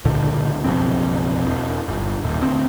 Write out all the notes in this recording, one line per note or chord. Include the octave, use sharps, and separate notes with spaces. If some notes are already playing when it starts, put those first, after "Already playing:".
C#2 A#2 D3
F#1 B1 F2 C4
E1
G1
D#1
D2 C4